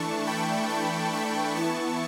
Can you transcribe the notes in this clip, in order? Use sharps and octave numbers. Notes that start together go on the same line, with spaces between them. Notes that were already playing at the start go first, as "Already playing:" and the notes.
Already playing: E3 A3 D4 A5 C#6
G5 B5
A5 C#6
A5 C#6
E3 B3 E4 A5 C#6